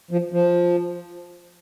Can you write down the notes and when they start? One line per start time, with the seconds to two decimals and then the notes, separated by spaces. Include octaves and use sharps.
0.11 F3
0.32 F3